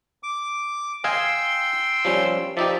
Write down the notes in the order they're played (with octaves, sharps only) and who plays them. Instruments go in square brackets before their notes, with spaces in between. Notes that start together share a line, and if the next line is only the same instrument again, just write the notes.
[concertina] D6
[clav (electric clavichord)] D#5 F5 G#5 [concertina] G5 C6 E6
[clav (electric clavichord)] F3 G3 C#4
[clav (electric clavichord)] F3 D#4 G4 [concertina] D5 E5